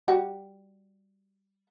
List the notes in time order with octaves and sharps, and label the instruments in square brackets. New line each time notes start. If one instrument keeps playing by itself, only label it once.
[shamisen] G3 F#4 G4